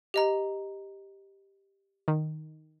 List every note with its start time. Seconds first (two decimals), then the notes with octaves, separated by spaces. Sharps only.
0.14 G4 D#5 A#5
2.08 D#3